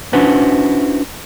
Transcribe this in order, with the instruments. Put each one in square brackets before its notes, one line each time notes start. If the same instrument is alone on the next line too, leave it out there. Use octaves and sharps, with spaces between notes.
[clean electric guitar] C#4 D4 E4 F#4 B4 C5